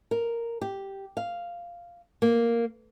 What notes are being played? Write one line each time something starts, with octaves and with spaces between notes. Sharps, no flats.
A#4
G4
F5
A#3